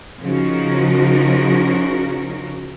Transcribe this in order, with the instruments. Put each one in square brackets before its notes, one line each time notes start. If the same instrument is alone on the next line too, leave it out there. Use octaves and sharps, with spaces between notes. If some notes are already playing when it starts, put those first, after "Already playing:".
[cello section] C#3 F3 D#4 F#4 A#4